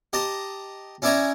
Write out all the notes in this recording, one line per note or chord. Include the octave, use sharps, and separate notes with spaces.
G4 D#5 A5 A#5
C#4 E4 D5 E5 G#5 A#5